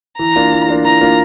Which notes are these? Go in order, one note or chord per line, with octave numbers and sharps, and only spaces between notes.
E3 A#5
A#3 D4 F4
E3
A#3 D4 F4
E3 A#5
A#3 D4 F4